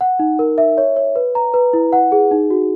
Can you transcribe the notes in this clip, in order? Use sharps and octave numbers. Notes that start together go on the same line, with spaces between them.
F#5
D#4
A#4
E5
C#5
C#5
B4
A#5
B4
E4
F#5
G#4
D#4
F#4